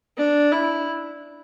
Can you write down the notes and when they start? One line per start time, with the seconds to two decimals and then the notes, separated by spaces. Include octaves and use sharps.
0.17 D4
0.52 E4